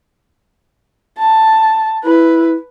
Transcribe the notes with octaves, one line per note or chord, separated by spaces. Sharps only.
A5
E4 B4